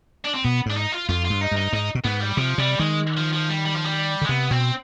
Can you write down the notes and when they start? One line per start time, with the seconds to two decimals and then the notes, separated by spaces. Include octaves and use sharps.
0.25 D4
0.34 C4
0.44 B2 B3
0.66 G#2 D4
0.77 D#4
0.92 F4
1.09 F2 F4
1.25 F4
1.30 G2
1.41 D#4
1.52 G2 D#4
1.73 G#2 D#4
1.95 B2
2.04 G#2 B3
2.20 G3
2.37 C3 F3
2.58 C3 G3
2.80 D#3 G#3
3.17 F3
3.33 F3
3.49 G3
3.65 G3
3.74 F3
3.84 G3
4.22 D3
4.24 G#3
4.28 C3 B3
4.51 B2 C4